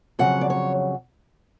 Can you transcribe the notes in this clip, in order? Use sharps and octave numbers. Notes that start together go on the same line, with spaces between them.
F2 C#3 F#3 F#5
D5
C#5